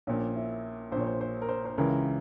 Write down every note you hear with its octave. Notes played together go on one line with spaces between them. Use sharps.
A#1 A#2 C#4
E4
A#1 A#2 C5 C#5
C5
C5
A#4
C5
C5
C#2 C#3 E3 A#4